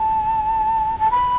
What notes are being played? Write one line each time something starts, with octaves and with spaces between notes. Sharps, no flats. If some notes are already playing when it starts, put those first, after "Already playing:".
Already playing: A5
A5
B5